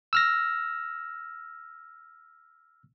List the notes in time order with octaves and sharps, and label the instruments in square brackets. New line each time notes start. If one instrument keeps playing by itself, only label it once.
[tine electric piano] E6 F6 A#6